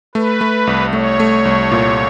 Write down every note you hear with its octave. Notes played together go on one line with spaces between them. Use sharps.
A3 B4
A3
C2
A3 C#5
A3
C2
A#2